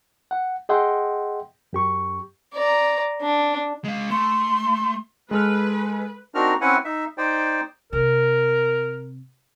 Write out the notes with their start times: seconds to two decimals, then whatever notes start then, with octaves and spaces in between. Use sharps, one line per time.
0.31 F#5
0.69 G#4 D#5 E5 F#5 G5 C6
1.73 F#2 G4 C#6
2.54 D5 A#5
3.21 D4
3.84 G#3 F5
4.10 A3 C6
5.31 G#3 A4 B4 F6
6.35 C4 D4 D#4 F#4 A#4 F6
6.61 C4 C#4 E4 B4 F#5 G#5
6.85 D#4 E5
7.18 D#4 C5 D5 G5
7.93 C3 A#4